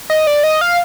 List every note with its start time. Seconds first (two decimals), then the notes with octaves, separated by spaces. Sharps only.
0.10 D#5
0.27 D5
0.44 D#5
0.61 F5